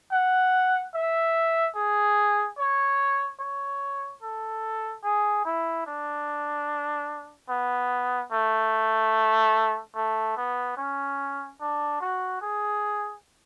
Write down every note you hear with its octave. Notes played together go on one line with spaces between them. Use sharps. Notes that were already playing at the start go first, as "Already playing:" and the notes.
F#5
E5
G#4
C#5
C#5
A4
G#4
E4
D4
B3
A3
A3
B3
C#4
D4
F#4
G#4